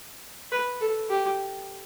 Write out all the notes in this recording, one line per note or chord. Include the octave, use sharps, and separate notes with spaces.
B4
A4
G4